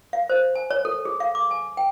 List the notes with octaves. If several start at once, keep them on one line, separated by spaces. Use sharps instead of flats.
F5
C5
G#5
C#5
A4
G#4
F5
D6
G#5
G5